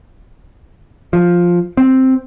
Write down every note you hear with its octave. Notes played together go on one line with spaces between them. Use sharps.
F3
C4